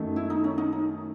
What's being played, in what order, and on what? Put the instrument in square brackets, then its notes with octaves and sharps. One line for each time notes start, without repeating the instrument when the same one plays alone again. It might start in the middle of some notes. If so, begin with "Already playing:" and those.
Already playing: [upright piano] F#2 D#3 A3
[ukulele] E4
D#4
C#4
D#4
D#4